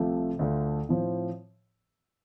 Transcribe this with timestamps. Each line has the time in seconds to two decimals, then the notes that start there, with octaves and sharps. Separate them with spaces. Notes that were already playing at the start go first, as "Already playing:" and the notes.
Already playing: C2 C3 F3 A3 F4
0.39 D2 D3 A3 D4 F4
0.89 A2 F3 C4